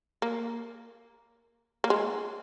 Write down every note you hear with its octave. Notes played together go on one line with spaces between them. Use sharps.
A#3
A#3
G#3